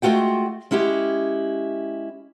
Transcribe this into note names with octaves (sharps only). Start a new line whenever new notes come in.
G#3 A3 F4 F#4 G5
G#3 C#4 E4 G4